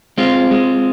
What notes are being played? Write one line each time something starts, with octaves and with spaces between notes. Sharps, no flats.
G#3 C4 F4
G#3